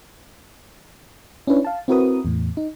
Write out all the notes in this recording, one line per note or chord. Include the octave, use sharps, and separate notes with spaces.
C#4 D4 E4 B4 C#5
F5 A5
C4 E4 F#4 A#4 B4 D#6
E2 A2
D#4